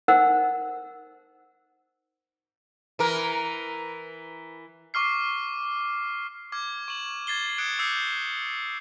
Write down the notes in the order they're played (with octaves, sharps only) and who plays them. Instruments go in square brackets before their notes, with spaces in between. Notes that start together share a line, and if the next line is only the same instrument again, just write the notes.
[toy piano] D#4 A#4 C5 F#5 E6
[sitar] E3 A#4
[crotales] C#6 D6 F6 C7
D6 F6 G#6
C#6 E7 F#7
G#6 A6 C7 G7
D#6 F#6 G#6 C#7 D7 F#7
D6 E6 G6 C7 C#7